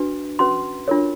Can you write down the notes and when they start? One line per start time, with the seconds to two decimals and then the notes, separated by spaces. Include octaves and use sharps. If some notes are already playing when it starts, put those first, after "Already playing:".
Already playing: D4 F#4 B4
0.39 C#4 F#4 B4 C6
0.88 D4 F4 A#4 C#5